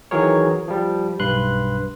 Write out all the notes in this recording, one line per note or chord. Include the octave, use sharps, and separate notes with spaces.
D#3 E3 F#3 G#4 A#4 C#5
F3 G3
B1 G2 B4 C6 F#6